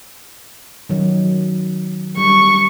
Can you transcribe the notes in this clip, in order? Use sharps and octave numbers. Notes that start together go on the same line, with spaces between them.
D#3 F#3
G3 C#6